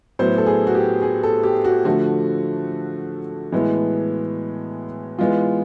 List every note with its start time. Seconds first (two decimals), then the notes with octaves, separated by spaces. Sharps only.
0.19 A2 F#3 B3 C5
0.38 A4
0.46 G#4
0.67 F#4
0.75 G4
1.02 G#4
1.23 A4
1.43 G4
1.64 F#4
1.85 D3 F3 A3 F#4
3.52 A2 E3 G#3 B3
5.19 E3 G#3 B3 F4